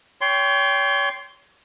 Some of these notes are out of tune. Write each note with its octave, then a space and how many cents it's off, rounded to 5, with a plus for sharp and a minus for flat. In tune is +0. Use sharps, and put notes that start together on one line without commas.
C#5 +35 G5 +0 C6 +0